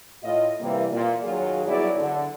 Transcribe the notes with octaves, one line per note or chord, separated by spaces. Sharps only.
A2 F4 D#5
C3 E3 G3 A#3
A#2
D#2 F#3 F4 G#4
G2 F#3 B3 E4 G#4 D5
D3